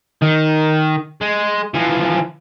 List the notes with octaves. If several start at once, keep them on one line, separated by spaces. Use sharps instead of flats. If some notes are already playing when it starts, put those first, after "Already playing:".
D#3
G#3
E3 F3